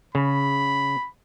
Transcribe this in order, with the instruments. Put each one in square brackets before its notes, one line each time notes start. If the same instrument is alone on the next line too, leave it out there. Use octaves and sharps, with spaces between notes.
[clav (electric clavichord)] C#3 [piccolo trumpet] B5